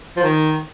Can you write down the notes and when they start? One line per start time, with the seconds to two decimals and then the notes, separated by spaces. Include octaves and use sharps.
0.16 F3
0.23 D#3